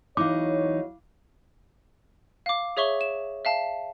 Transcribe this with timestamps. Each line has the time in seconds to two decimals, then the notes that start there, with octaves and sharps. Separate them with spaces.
0.17 E2 E3 F#3 D#4 E4 C#5 F5 D6
2.46 F5 D6
2.77 G#4 C#5 E5 C#6 G7
3.01 E7
3.45 E5 F5 A5